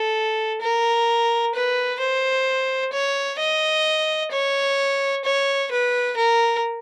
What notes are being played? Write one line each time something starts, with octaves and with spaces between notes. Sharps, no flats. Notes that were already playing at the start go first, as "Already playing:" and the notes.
Already playing: A4
A#4
B4
C5
C#5
D#5
C#5
C#5
B4
A#4